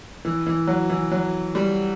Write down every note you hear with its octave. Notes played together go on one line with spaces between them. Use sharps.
E3
E3
F#3
E3
F#3
G3